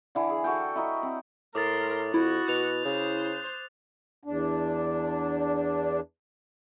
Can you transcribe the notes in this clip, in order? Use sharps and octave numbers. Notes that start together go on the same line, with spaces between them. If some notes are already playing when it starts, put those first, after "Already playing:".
D3 E3
G#4
F#4 A4 G5
E4 D#5 A#5 C#6
C4
A2 A#4 C6 D6 D#6 A6
F2 E4 F#4
B2 F#6 F7
C#3 C5
E2 D4